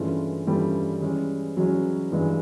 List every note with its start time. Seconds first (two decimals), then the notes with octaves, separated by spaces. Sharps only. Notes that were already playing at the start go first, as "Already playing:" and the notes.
Already playing: G2 E3 G#3 A3 C#4 F4
0.47 G2 E3 G3 A3 C#4 F4
1.02 E3 G#3 C#4
1.57 E3 F#3 G#3 C#4
2.12 G2 E3 G#3